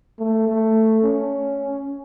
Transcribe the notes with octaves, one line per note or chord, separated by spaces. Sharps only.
A3
A3
C#4